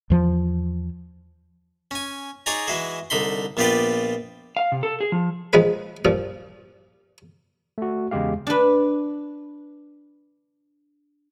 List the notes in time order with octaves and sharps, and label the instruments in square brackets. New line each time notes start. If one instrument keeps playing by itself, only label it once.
[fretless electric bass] E2 F3
[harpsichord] C#4 G#5
D#4 G#4 C#5 D5 G#5 A#5
E3 G#3 E4 F#4 G#4
C2 D3 D#4 B5 C6
A#1 B3 F4 G4 B4 D5
[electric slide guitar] F5
C3
A4
G#4
F3
[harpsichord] A#1 F3 G#3 B4
G2 A#2 F3
[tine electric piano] A3 F#4
E2 C#3 G#3 G4 F5
[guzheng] D4 B4